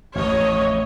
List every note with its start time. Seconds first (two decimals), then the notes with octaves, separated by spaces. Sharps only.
0.15 A1 F2 C#5 D#5